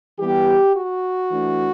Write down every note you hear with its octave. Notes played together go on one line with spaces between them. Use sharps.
E3 G3 B3 G4
F#4
E3 A3 D4